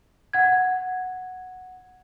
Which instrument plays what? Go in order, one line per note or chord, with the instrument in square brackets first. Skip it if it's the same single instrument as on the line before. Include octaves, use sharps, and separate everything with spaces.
[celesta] F#5 G#6